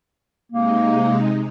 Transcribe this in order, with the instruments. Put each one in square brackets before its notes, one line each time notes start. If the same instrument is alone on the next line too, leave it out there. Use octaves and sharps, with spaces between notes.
[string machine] C3 G#3 D#4 [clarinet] A#3